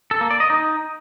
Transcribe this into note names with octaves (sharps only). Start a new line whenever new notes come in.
A4
A#3
D5
D#5
D#4